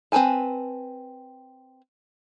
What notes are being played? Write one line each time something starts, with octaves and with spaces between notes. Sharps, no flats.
C4 A#4 B4 G#5 A5